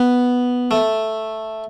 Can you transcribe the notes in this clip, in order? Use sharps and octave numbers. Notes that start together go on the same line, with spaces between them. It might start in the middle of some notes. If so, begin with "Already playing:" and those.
Already playing: B3
A3